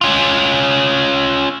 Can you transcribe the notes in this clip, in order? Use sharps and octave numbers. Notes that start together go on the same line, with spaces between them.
C#4 F4